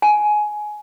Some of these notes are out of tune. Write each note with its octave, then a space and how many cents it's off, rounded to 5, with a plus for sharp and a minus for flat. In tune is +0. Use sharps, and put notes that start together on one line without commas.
G#5 +15